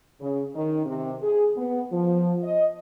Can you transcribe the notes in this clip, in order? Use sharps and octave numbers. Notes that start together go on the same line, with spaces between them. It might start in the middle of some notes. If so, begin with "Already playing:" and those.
C#3
D#3
C3
G#4
B3
F3
D#5